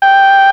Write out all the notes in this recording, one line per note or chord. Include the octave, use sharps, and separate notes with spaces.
G5